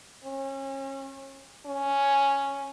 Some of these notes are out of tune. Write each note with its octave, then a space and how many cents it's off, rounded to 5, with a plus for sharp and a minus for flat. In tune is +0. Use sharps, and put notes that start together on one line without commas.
C#4 -35
C#4 +0